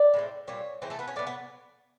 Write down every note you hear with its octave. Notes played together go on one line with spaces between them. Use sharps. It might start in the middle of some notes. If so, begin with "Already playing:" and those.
Already playing: D5
A2 E3 G#3 C4
A#2 G3 C4 C#5
E3 G#3 C4 D#4 C5
A3 A4
B3 B4
C#4 C#5
A2 F#3 B3 D5
B3 B4